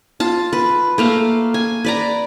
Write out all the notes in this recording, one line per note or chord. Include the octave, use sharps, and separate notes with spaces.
F4 A5
B4
A3 A#3 F5
G#5
B4 D5 A#5